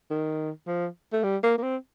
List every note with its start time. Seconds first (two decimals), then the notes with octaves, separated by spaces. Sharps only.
0.11 D#3
0.67 F3
1.13 A3
1.24 G3
1.43 A#3
1.58 A#3
1.63 C4